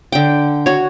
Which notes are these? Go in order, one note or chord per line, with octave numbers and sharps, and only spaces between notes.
D3 G5
F#4 C#5